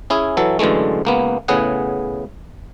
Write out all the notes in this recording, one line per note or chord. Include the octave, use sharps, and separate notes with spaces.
C#4 E4 G#4
E3 F#3 A4
F#2 D3 E3 G#3 A3
C#2 A#3 B3
A2 C#3 B3 G#4 F#5